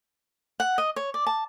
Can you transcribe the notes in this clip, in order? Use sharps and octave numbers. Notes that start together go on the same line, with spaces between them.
F#5
D#5
C#5
D5
A5